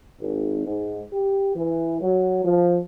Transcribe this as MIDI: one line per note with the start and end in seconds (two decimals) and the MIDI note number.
0.19 0.62 32
0.67 1.00 44
1.12 1.51 67
1.55 1.96 52
2.00 2.44 54
2.44 2.78 53